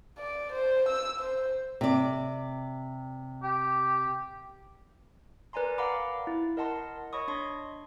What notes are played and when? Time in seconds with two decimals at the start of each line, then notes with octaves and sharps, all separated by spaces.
0.19 D5
0.52 C5
0.89 E6
1.20 C5
1.81 C3 D5
3.43 G4
5.53 A#4 B4 D5 G#5 A#5 C6
5.78 F5 F#5 A#5 B5 D6
6.27 E4
6.57 A#4 D#5 F#5 A5 C6
7.13 C#5 D#5 B5 C#6 D#6
7.28 D4 C6 C#6